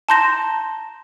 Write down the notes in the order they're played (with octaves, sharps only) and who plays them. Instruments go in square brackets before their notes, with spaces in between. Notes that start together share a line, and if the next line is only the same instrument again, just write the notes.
[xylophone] A5 A#5 C6 G6 A#6 E7